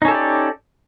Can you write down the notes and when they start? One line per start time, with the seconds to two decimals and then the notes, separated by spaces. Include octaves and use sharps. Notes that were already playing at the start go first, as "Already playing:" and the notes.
0.02 D#4
0.05 C#4
0.08 A4
0.11 G4
0.14 D5